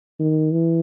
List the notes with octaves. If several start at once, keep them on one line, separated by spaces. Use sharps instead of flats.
D#3
E3